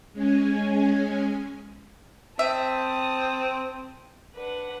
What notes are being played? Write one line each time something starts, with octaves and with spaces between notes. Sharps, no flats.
G#3 C#4 G#5
C4 E5 A5 D#6
D4 B4 F#5